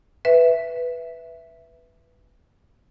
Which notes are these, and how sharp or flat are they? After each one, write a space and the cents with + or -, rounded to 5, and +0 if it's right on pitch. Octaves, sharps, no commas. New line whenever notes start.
B4 +0 E5 +5